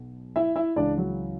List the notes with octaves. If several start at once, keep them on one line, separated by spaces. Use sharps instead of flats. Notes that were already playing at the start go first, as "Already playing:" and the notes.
Already playing: B1 B2
E4 E5
E4 E5
C#2 C#3 E3 D4 D5
F#3 F#4